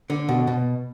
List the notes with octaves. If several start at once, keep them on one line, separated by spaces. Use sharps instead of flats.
D3
B2
B2